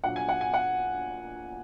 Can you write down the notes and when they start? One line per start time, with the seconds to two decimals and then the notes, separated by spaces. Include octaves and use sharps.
0.04 A#1 A#2 F#3 F#5
0.16 G#5
0.29 F#5
0.41 G#5
0.54 F#5